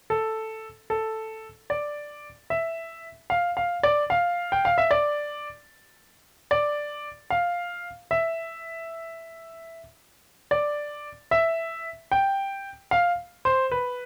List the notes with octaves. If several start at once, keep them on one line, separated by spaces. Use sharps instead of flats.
A4
A4
D5
E5
F5
F5
D5
F5
G5
F5
E5
D5
D5
F5
E5
D5
E5
G5
F5
C5
B4